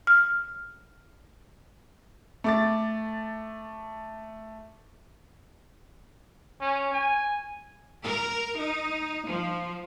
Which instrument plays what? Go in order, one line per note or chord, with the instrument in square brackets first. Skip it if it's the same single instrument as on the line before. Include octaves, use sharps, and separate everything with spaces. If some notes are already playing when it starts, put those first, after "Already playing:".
[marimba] F6
[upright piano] A3 D6 A6
[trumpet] C#4
G#5
[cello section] A#4
D#4
F3